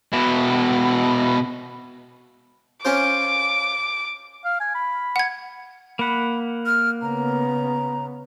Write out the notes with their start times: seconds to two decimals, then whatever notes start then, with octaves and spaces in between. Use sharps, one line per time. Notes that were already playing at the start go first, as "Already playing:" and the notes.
0.13 B2 E4
2.85 C#4 F4 C5 D6
4.45 F5
4.60 G#5
4.75 B5
5.16 F#5 G#6
5.99 A#3 F#5 B5
6.66 F6
7.02 C#3 B3 A#5